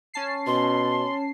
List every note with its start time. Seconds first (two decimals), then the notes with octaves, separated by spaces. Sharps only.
0.14 C#4 A5 C7
0.47 B2 C6